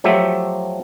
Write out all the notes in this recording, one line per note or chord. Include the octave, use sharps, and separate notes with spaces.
F3 F#3 A3 G4 E5